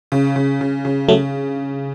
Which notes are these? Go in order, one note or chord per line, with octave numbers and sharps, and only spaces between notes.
C#3
C#3
C#3
C#3
C#3 F#3 A3